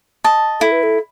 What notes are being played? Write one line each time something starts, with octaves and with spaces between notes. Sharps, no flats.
D#5 A5
E4 A4
B4
A4